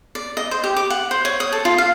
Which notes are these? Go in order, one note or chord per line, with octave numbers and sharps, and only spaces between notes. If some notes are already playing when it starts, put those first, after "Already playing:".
D5
D#5
C5
G4
D6
F#5
C5
C#5
D#6
A4
F4
F5